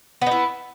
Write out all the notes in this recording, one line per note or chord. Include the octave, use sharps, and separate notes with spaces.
B3 D#4 E4